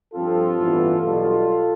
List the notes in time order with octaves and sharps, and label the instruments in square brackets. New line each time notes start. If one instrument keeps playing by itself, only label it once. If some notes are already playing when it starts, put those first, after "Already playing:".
[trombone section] G2 F3 C4 F4 A4
A1 G2 E3 B3
B1 B2 G3 F4 A4